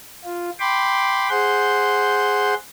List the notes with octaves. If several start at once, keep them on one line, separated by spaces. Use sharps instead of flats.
F4
G5 B5 C6 D6
G#4 C5 F#5 C6 G6